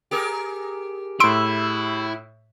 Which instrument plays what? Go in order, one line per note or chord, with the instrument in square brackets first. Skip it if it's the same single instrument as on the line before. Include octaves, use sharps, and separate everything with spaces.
[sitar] G4 G#4 A#4
[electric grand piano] A2 E6 [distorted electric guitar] E4 [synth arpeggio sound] C6 D7